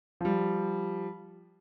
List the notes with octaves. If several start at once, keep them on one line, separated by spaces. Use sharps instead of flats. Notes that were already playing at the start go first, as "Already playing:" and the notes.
F3 G3